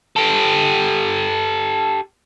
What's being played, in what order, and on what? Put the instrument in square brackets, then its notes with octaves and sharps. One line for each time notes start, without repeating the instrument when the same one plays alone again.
[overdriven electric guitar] G4 A4